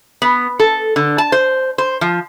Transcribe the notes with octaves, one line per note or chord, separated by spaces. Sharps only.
B3
A4
D3
A5
C5
C5
F3